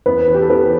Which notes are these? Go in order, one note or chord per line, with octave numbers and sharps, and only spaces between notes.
E2 B3 B4
E3
G4
A4
E3 B3 B4